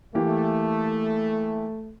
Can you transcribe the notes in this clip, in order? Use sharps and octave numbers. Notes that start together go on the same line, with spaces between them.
E3 A3 A#3 G4